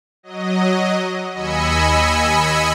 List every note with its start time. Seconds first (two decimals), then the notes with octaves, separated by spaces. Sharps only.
0.23 F#3 D#5
1.34 D#2 D#5 G#5 B5 E6 C#7